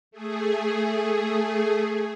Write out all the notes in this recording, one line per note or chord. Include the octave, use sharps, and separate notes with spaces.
A3 G#4